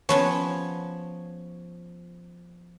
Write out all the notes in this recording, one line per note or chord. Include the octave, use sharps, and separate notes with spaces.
F3 B3 C#4 C#5